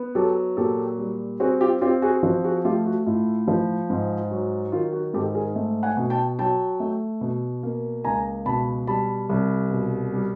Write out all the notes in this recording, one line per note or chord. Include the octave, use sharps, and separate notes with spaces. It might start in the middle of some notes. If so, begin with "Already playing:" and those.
Already playing: B3
F#3 G4 A4
A#2 G4 A4
G3
C4 F#4 G#4
F4 G4
C4 F4 G4
F#4 G#4
F3 F#4
F#4 G#4
A3 F4 G4
F#4
A2 F4
F3
G#2
F#3
D#3 F4
F#4
G#2 G4 A4
G#4 A#4
A3
F#5 G#5
B2
G5 A5
F#3 G5 A5
A3
B2
A#3
C#2 G#5 A#5
B2 A5 B5
G3 A5 B5
C2
B2
G3